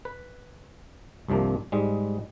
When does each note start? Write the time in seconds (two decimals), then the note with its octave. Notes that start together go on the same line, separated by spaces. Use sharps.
0.05 B4
1.28 C2 G2 C3 F3 A#3
1.72 G#2 G3 G#3